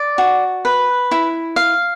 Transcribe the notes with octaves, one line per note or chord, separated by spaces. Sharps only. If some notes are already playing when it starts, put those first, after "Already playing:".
Already playing: D5
F#4
B4
E4
F5